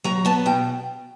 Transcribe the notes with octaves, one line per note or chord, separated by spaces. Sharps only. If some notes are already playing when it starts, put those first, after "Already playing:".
F#3 A#5
B3 A5
B2 G5